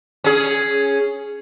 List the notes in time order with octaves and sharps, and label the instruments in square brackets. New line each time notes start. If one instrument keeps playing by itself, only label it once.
[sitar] C#4 G#4